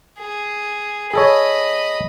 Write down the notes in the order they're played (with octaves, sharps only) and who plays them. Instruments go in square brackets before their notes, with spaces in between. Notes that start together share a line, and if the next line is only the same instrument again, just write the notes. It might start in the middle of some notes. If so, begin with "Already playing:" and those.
[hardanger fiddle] G#4
[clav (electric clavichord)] G#4 A4 C#5 [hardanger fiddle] D#5 B5